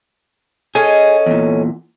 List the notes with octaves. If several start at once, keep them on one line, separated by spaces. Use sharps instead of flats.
C#4 G#4 A4 D#5
E2 A#2